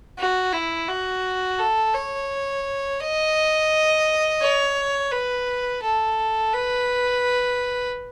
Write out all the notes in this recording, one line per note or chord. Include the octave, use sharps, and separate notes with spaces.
F#4
E4
F#4
A4
C#5
D#5
C#5
B4
A4
B4